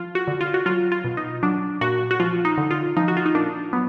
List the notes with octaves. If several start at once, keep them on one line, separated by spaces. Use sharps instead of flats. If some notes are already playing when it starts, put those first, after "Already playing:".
Already playing: F3 F4
F#4
D3
F4
F#4
F#3 F4
F4
B2
D#4
F#3 D4
A#2 F#4
F#4
F3 F4
D#4
D3
F4
F3 D#4
F#4
F4
D#4
A#2 D4
F#3 B3